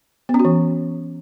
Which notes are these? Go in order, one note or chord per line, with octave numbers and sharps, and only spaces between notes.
B3
C#4
F#4
E3